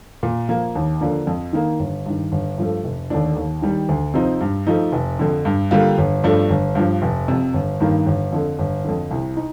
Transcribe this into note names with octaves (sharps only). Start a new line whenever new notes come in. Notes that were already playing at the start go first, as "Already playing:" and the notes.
A#2
F3 A#3
D#2
D3 F3 A#3 D4
F2
D#3 A#3
G1
G2 D#3
G1
G2 F3 A3
F1
D#2 D3 A3 D4
D#2
D#3 G3
D2
C3 F3 C4 D#4
G2
F3 A3 D#4
F1
F2 D3
G2
D3 G3 A#3 F4
G1
G2 F3 A3 D4
G1
G2 F3
F1
F2 C3
G1
G2 D#3 A#3
G1
F2 D3
G1
F2 D3
C2
D#4